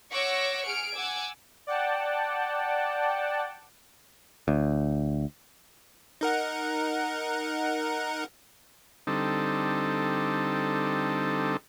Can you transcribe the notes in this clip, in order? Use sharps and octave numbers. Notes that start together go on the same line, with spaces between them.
C#5 F#5 C#6 D6 E6 A#6
G#4 F6 C#7 D7
F#5 G#5 D6 E6 G#6
D5 F#5 G5 A5
D2
D#4 A#4 F#5
D3 G3 C4 D#4 A4